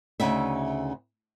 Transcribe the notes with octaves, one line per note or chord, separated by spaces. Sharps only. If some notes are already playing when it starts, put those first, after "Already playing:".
D2 C#3 D#4 E5